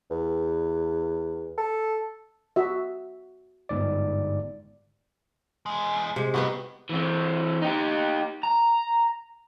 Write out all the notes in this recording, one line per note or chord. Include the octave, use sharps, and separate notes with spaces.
E2
A4
F#4 E5
G1 G#2 D5
E2 G#3
C3 G#3
G2 B3 D#4 F#4
E3 C4
D#4 G4
A#5